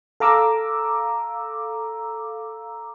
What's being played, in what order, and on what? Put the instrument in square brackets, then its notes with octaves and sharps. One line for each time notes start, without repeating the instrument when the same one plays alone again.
[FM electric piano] A4 F5 A#5 D6 E6